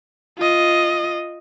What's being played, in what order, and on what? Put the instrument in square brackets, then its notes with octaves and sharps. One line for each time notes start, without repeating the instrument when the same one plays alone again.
[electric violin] F4 D#5